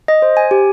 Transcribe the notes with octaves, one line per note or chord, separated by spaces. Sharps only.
D#5
C5
G#5
G4